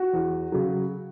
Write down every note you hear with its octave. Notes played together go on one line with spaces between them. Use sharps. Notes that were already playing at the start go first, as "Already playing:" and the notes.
Already playing: F#4
E2
C#3 F#3